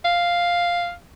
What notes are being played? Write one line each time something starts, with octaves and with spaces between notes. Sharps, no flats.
F5